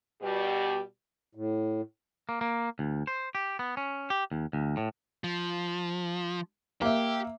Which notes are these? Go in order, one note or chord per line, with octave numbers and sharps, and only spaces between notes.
B2 G3 G4
A2
A#3
A#3
D2
C5
G4
B3
C#4
G4
D#2
D2
A2
F3
A#3 G4 E5